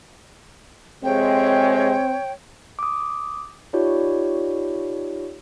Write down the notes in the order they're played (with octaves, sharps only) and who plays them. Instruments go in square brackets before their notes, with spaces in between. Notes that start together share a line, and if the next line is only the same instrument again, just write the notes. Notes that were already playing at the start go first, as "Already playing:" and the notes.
[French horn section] F2 C3 G#3 [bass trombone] C4 [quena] C#5 [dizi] G5
[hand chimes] D6 D#6
D#4 F4 G4 C#5 D5